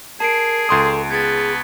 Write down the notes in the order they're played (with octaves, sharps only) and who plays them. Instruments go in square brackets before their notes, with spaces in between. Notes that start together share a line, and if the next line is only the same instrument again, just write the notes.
[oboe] G#4 [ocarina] A#4 [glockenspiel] A5 C7 D7
[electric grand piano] C#2 C6 D#6 [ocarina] A4
[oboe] B3 [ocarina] G#4 [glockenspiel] G#6 A6